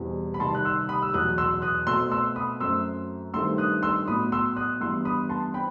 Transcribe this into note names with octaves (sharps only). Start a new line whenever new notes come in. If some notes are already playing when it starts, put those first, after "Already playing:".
Already playing: E2 B2 G3 C4
B5
C3 D#3 G3 A5 C6
F#6
C6 E6
B5 D#6
E6
E2 B2 F#3 D#6 F#6
C6 E6
D#6 F#6
B2 A3 C4 C6 E6
C6 E6
B5 D#6
F#2 F#3 A3 C4 C6 E6
G2 D#3 A3 C4 C6 E6
D#6 F#6
C6 E6
A2 F#3 B3 B5 D#6
C6 E6
D#6 F#6
G2 E3 B3 C6 E6
B5 D#6
A5 C6
C4 G5 B5